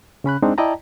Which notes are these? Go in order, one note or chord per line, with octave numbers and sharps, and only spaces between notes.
C#3 C#4 B5 F#6
G#3 C4 D4 D#4
E4 D5 D#5 G5 A5 A#5